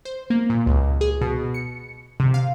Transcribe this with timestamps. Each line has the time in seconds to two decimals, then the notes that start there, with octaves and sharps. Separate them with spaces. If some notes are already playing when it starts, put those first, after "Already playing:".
0.05 C5
0.30 A#3
0.50 A#2
0.66 C#2
1.01 G#4
1.21 B2
1.54 C#7
2.20 C3
2.34 F5